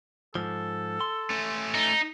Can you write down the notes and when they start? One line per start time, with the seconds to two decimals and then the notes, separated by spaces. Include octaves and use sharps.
0.35 G#2 F3 A4
1.01 C6
1.30 A3 C#4
1.75 D#4